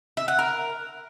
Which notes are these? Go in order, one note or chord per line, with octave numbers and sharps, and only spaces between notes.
E5
F#5
A#4